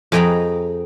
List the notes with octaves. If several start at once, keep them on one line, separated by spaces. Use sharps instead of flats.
F2 G#4 D#5 G5 A#5 B5